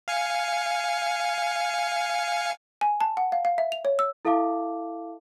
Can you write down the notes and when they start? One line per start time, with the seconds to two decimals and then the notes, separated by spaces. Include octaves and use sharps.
0.08 F5 G#5 C#7
2.81 G#5
3.01 A5
3.17 F#5
3.32 F5
3.45 F5
3.58 E5
3.72 F7
3.85 C#5
3.99 E6
4.25 E4 A4 E5 F5 A5 D6